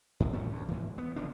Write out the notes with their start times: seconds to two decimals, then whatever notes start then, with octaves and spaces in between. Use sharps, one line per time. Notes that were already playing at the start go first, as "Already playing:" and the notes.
0.20 G#2 D3
0.32 D2 A2 G3 C#4
0.51 D2
0.68 G#2 E3
0.98 B3
1.16 F#1 D3 F3 D4